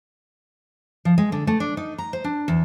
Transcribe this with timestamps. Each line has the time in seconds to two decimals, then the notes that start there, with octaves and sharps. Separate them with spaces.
1.05 F3
1.18 G#3
1.32 D3
1.47 A3
1.60 D4
1.77 D#4
1.98 A#5
2.13 C5
2.24 D4
2.48 E2